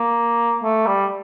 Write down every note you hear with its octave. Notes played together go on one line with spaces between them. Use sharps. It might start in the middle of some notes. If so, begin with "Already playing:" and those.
Already playing: A#3
A3
G3